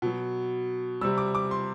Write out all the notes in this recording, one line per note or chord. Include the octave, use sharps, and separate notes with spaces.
B2 F#3
C3 G3 E6
D6
D6
C6